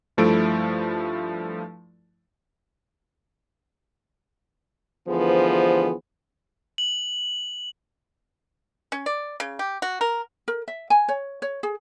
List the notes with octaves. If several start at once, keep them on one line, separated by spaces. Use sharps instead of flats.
G2 F3 A3 E4 A4 D7
D2 E3 F3 B3 G#4 C5
F#7
C#4
D5
C#3
G4
F#4
A#4
A#4
E5
G#5
C#5
C#5
G#4